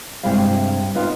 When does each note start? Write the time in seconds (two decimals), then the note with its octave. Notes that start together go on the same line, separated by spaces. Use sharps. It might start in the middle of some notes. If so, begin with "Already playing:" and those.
0.23 G2 C3 G#3 E4 F5
0.95 B3 D#4 F4